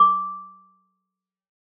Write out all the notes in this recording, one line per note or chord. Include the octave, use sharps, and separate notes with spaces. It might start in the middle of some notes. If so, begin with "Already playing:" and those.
Already playing: D6